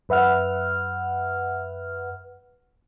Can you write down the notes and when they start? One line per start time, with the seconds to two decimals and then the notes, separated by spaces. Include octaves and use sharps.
0.09 F#2 B4 E5 F#5 F6